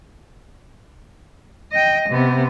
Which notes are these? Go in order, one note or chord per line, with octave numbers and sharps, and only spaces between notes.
D#5 G5
C3 B3